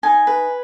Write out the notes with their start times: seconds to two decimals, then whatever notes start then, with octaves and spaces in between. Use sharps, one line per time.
0.03 D#4 G#5
0.27 B4